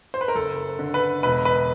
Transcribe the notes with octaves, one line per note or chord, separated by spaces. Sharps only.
C5
B4
A#4
F#1 A4
D3
B4
E1 B4
B4